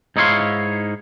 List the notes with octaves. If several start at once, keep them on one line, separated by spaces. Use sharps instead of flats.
G#2 D#4 E4 C#5 F5 C6